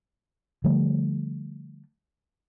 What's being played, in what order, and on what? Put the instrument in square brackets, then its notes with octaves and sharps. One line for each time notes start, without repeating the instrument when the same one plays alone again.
[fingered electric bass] D3 F3 G3 A3